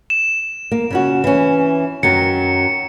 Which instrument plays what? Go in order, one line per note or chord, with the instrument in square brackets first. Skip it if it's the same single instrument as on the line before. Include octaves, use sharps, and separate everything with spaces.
[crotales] E7
[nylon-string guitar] A#3
C#3 C#4 F#4
E3 C#4
[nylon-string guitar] F#2 D#3 F#3 [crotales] C#7